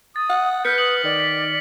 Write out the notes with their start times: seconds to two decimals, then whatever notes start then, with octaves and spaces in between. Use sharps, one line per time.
0.16 D#6 A6
0.29 F#5
0.65 B4 F6 G6 B6 C#7
0.78 D#6 F#7
1.04 D#3 D5
1.20 B6